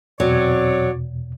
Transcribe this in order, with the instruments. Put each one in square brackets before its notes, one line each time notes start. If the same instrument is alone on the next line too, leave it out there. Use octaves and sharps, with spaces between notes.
[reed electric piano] E2 B2 [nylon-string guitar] F#3 [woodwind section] C4 C#5 D5